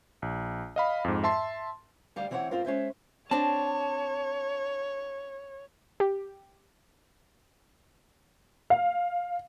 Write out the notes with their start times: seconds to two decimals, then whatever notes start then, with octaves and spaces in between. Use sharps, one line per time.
0.22 A#1
0.76 D#5 F5 B5
1.04 F2 G#2
1.24 E5 A5 C6
2.16 D2 G3 F5
2.30 D2 E3 C4 B4 C#5 F#5
2.51 G#2 C4 F4 A#4 C5
2.65 G#3 C#4 C5 E5
3.31 C4 D4 C#5 A5
6.00 G4
8.70 F5